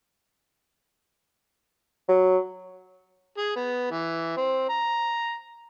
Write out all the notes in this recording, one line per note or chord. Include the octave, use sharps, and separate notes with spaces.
F#3
G#4
B3
E3
C4
A#5